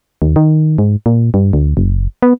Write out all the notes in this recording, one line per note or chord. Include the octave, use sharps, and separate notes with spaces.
D#2
D#3
G#2
A#2
G2
D2
F#1
B3